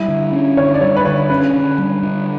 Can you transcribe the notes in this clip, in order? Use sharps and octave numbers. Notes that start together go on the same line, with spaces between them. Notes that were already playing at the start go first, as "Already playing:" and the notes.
Already playing: G3 E4
D3
C#4
D3 C#5
D5
G3 C#5
B4
D3 C#5
C#4 B4
D3
G3
D3